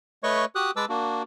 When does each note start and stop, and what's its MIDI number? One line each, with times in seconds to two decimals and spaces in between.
0.23 0.45 57
0.23 0.45 71
0.23 0.45 73
0.23 0.45 75
0.23 0.45 85
0.55 0.71 66
0.55 0.71 67
0.55 0.71 87
0.55 0.71 90
0.76 0.85 56
0.76 0.85 71
0.76 0.85 81
0.76 0.85 86
0.76 0.85 88
0.89 1.23 58
0.89 1.23 62
0.89 1.23 66